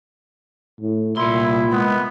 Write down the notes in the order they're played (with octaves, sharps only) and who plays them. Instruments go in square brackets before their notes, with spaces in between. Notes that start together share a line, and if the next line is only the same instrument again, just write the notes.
[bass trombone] A2
[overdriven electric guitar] C2 C6 [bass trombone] A#2 [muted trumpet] E4
[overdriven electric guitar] G#3 [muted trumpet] B3